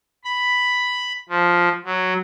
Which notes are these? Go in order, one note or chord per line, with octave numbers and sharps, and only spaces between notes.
B5
F3
F#3